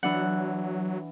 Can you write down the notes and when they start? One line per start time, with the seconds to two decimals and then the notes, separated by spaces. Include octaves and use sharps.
0.03 E3 F#3 D4 F#5